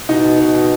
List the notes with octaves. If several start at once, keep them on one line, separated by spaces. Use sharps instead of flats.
B2 D#4
B2
B2
B2